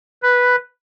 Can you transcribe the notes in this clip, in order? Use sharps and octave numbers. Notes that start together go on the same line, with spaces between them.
B4